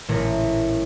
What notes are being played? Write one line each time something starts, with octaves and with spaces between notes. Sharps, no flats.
A1 A#2 G#3 A3 A#4